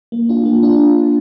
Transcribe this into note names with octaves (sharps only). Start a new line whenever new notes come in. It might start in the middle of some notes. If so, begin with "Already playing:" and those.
A#3
D4 F4
A#3
D4 F4